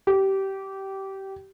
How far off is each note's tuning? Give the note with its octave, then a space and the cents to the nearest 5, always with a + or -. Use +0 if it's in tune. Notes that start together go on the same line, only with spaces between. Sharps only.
G4 -20